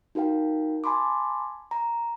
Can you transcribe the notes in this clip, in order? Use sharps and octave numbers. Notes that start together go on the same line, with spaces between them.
D#4 F#4 A#4 F5 G5
G#5 A5 B5 C6 D6
A#5